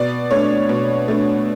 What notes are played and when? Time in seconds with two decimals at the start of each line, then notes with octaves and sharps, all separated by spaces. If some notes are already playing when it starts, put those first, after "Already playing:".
Already playing: B2 D5
0.31 A3 D4 C#5
0.69 B2
1.08 A3 D4